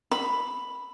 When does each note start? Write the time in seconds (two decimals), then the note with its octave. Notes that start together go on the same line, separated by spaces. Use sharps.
0.11 B5